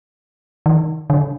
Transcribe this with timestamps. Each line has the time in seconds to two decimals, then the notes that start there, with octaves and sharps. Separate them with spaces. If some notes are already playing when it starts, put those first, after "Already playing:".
0.66 D#3
1.10 D3